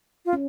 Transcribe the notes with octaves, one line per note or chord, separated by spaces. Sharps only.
F4
C#4